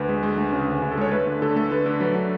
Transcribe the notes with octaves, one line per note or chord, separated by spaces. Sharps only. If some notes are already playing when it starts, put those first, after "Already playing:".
Already playing: D2 B4
G#3
G#3
D2
C#3
D2
D2
A4
G#3 C#5
A3 B4
D3
D3 A4
A3 A4
D3 B4
D3
F#3 B4
D3